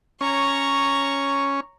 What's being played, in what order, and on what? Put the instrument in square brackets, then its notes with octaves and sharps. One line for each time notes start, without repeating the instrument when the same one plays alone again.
[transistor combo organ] C#4 [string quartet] C#5 A#5 C#6